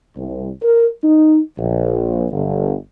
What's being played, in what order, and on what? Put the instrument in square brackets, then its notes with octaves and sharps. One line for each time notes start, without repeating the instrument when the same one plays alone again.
[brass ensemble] C2
A#4
D#4
A#1
G1